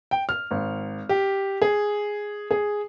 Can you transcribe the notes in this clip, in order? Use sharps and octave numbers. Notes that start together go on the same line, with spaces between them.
G5
F6
G#1
G4
G#4
G#4